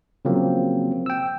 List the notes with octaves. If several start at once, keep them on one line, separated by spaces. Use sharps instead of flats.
C#3 F3 F#3 A#3 C4
G5 E6